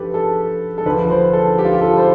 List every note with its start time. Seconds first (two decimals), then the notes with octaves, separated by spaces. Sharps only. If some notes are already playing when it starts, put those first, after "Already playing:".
Already playing: G2 F3 G4 A4 B4
0.14 A4
0.78 A4
0.85 D2 D3 F3 B4
1.10 C5
1.33 A4
1.58 G4
1.65 F4
1.73 G4
1.81 A4
1.97 C5